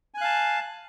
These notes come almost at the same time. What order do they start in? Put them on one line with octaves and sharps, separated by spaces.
G#5 F#6 F5 A5